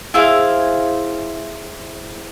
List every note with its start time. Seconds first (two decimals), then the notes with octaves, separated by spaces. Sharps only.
0.14 E4 G#4 C5 F5